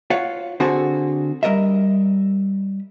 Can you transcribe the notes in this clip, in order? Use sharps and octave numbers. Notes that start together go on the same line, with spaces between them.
F4 C#5 F5 F#5
D3 C4 F#4 G#4 A4 A5
G3 A#4 D#5 E5